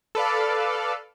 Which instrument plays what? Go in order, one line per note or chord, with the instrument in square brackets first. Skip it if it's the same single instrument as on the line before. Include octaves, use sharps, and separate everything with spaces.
[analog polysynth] A4 B4 D5 F5